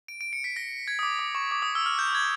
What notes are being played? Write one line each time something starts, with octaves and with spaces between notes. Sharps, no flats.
D7
D7
C#7
B6
A#6
G#6
D#6
D6
D6
C#6
D6
D#6
E6
F6
G6
G#6